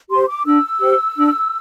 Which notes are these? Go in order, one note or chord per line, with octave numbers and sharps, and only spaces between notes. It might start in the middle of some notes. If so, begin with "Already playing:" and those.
G4 C5 C6
D6
D4 E6
G4 C5
D4